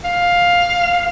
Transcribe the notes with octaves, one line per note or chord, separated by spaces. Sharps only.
F5